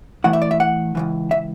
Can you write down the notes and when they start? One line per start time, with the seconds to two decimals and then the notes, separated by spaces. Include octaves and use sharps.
0.24 A2 E3 A3 E4 F#5
0.33 E5
0.42 D5
0.51 E5
0.60 F#5
0.95 C#2 C#3 E3
1.31 E5